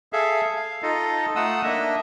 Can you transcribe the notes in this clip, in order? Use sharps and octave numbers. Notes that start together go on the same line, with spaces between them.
G#4 A4 E5 F5
F5
D#4 F4 A4 D#5
A3 D#4 F4 F#5 D#6 E6
A#3 D4 D#5 E5